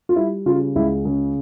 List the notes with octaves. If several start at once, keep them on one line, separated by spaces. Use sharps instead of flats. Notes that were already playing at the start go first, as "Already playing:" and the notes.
F4
G3 E4
C#3 F4
C#2 E4
C#3